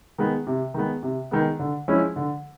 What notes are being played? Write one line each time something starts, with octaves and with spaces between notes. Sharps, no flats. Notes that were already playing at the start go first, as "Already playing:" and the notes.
D#3 G#3 B3
C3
D#3 G#3 B3
C3
D#3 G#3 B3
D3
F3 G#3 C#4 E4
D3